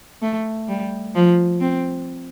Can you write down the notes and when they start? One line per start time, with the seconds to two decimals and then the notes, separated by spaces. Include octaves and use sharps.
0.22 A3
0.68 G3
1.15 F3
1.61 C4